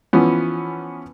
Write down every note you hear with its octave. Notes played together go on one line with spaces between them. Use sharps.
E3 F3 B3 C#4